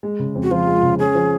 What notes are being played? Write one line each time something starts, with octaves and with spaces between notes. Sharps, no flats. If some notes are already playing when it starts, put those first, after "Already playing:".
G#3
C#3
F2
F#4
F3 F4
G#3
C#3
C#4 G#4
F3